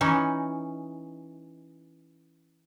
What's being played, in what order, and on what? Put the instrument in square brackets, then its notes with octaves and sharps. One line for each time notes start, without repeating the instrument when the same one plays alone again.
[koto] E3 C#4 D#4